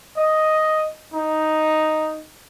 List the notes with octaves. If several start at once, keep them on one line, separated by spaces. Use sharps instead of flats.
D#5
D#4